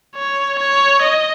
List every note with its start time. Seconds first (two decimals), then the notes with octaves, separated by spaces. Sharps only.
0.16 C#5
0.59 C#5
1.02 D#5